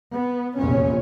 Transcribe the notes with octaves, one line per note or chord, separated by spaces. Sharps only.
B3
F1 A#1 E2 A#2 C#4